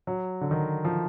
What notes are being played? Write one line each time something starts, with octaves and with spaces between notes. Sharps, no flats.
F#3
D3
D#3
F3